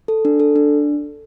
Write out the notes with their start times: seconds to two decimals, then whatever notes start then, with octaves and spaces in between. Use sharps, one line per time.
0.08 A4
0.25 D4
0.40 A4
0.56 D4